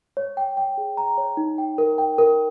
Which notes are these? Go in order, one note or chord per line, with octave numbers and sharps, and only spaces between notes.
C#5
G5
G5
G#4
A#5
C#5
D#4
G5
A#4
G5
A#4